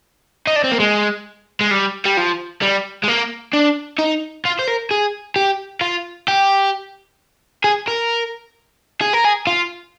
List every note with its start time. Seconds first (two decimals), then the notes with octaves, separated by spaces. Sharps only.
0.47 D#4
0.56 D4
0.64 C4
0.72 A#3
0.80 G#3
1.61 G#3
1.71 G3
2.06 G3
2.17 F3
2.62 G3
3.04 G#3
3.08 A#3
3.54 D4
3.99 D#4
4.45 F4
4.59 C5
4.67 A#4
4.91 G#4
5.36 G4
5.81 F4
6.28 G4
7.64 G#4
7.88 A#4
9.01 G#4
9.13 A#4
9.25 G#4
9.47 F4